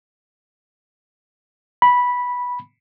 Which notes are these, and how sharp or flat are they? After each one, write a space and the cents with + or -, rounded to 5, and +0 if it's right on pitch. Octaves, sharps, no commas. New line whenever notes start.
B5 -10